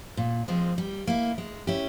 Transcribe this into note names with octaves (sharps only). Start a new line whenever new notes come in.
A#2
F3 G#3 C4
G3
A#3 E4
G#3
C#4 E4 G4